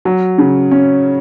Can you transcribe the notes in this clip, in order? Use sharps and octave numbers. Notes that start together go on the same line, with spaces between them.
F#3
C#3
C#4